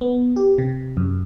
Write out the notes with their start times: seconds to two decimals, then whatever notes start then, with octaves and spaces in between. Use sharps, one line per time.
0.01 B3
0.36 G4
0.58 C3
0.97 F#2